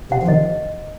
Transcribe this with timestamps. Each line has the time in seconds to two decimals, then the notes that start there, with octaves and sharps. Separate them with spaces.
0.12 C3 F#5
0.23 F3
0.28 D#3 D#5